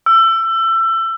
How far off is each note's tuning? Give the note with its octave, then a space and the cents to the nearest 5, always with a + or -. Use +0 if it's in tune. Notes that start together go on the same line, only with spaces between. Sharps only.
E6 +25